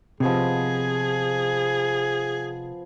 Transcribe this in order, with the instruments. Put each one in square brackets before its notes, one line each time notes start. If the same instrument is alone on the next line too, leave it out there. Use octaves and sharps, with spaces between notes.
[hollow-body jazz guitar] C3 [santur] F3 B3 D#5 [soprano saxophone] G#4